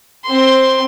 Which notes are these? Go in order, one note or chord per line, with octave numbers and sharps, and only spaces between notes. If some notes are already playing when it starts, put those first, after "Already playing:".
C4 C6